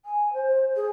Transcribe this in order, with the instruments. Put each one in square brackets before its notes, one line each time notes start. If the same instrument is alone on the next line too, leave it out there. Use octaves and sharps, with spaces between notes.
[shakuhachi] G#5
C5
G#4